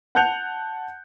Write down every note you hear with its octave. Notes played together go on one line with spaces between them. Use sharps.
F#5 A5 F#6 G6 C#7 F7